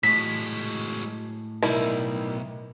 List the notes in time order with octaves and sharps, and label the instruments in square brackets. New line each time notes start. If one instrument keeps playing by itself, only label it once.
[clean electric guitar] A2 [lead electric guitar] F#3 G#3 [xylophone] B6
[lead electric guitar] B1 [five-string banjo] D#3 G3 E4